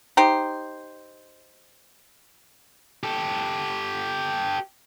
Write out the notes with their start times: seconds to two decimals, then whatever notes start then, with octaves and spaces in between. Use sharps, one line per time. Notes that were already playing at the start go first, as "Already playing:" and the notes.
0.17 D#4 G4 C5
3.04 G4 A4